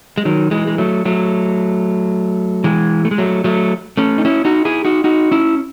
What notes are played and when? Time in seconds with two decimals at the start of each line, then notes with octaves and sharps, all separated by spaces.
0.18 G#3
0.25 D#3 F#3
0.51 E3 G#3
0.67 G#3
0.78 F#3 A3
1.05 F#3 A3
2.64 E3 G#3
3.05 A3
3.11 G#3
3.18 F#3 A3
3.44 F#3 A3
3.97 A3 C#4
4.18 D#4
4.25 C#4 E4
4.45 D#4 F#4
4.65 E4 G#4
4.85 D#4 F#4
5.04 D#4 F#4
5.31 C#4 E4